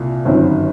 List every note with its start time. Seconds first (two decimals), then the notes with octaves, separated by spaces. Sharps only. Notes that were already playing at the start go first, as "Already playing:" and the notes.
Already playing: C2 A#2
0.25 G1 F#2 D#3 F#3 C4